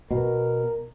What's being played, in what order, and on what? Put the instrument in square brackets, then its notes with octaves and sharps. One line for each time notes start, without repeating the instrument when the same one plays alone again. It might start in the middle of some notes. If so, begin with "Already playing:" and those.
[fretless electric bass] B2 [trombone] A#4